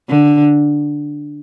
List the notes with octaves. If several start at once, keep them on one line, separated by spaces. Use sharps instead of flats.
D3